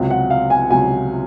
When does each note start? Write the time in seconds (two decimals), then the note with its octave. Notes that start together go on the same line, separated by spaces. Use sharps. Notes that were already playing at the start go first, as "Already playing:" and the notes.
Already playing: C#2 C3 F#3
0.11 F#5
0.30 F5
0.50 G#5
0.71 C#2 C3 F#3 G#5